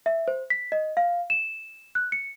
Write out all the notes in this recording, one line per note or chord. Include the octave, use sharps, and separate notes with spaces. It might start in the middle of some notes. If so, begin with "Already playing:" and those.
E5
C5
B6
D#5
F5
E7
F#6
C#7